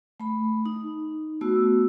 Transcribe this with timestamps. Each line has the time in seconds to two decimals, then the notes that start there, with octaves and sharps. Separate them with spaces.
0.20 A3 B5
0.66 D#4
1.41 A3 B3 F#4 E6